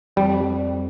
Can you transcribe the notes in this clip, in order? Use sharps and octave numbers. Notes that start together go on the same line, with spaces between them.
F2 G3